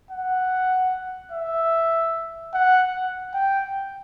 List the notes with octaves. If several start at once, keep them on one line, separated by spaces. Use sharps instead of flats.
F#5
E5
F#5
G5